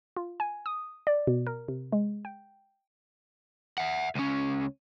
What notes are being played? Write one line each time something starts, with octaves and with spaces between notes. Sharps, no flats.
F4
G#5
D#6
D5
B2
A#4
C3
G#3
G5
E5 F#5
C#2 C#4